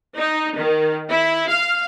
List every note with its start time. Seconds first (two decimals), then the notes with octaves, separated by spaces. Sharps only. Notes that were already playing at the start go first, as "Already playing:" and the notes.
0.17 D#4
0.57 D#3
1.11 E4
1.49 F5